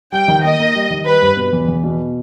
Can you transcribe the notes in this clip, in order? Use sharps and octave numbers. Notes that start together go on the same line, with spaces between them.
G3 G5
D#3
A#3 D#5
A#3
G3
D#3
G3 B4
G2
B2
E2
E2
B2